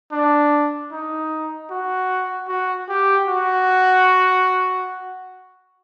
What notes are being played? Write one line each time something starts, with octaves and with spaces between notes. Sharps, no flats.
D4
D#4
F#4
F#4
G4
F#4